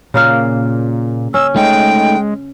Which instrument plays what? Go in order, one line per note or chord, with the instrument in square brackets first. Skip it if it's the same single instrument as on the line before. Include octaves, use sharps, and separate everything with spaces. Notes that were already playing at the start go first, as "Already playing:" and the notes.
[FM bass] A#2 [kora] C#3 A#3 F5
[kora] C#4 [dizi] E6
[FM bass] G#3 [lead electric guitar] A3 D#4 [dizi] G5